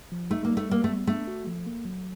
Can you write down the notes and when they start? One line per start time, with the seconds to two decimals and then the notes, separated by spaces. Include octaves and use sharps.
0.12 F3
0.30 A3 D#4
0.45 G3 A#3
0.57 A3
0.70 G3 A#3
0.84 A3
0.88 B3
1.07 A3 D4
1.27 F#4
1.47 F3
1.66 A#3
1.85 F#3